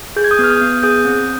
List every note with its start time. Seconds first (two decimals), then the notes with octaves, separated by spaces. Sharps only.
0.16 G#4 G6
0.24 G#6
0.31 D#6 G6
0.39 B3 F6
0.50 D#6 G6
0.61 B3
0.83 G#4 D#6 G6
1.05 C4